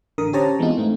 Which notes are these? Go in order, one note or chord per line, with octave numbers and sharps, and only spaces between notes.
A1 D3 A#4 D#6
C#4 G4 C5 C#5 A5 A#5
E3 G#3 B3 C4 D#4 F4
G#2 A3 C4 D#4